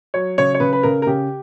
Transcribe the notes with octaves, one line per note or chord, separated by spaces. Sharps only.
F#3 C#5
C#3 C#5
C#5
C#3 B4
B4
C#3 A#4
A#4
C#3 G4